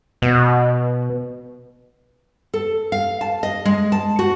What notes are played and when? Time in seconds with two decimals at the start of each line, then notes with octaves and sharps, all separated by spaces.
0.22 B2
2.54 A4
2.92 F5
3.21 A5
3.43 D#5
3.65 G#3
3.92 A5
4.19 F#4